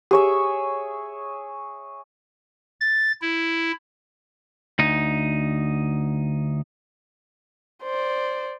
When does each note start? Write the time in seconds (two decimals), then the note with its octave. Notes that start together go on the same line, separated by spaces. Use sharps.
0.11 G4 G#4 C#5 E5
2.81 A6
3.22 E4
4.79 D2 D#4
7.83 C5 D5